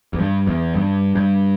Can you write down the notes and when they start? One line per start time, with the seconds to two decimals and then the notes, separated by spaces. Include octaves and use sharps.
0.13 E2
0.19 G2
0.47 E2
0.74 G2
1.15 G2